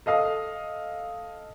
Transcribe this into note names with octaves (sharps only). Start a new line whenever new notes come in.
A4 D#5 F5 D#6